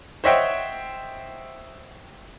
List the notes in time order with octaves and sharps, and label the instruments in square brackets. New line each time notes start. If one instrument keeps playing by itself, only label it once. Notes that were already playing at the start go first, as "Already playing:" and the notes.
[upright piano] C5 C#5 D#5 E5 F#5 G5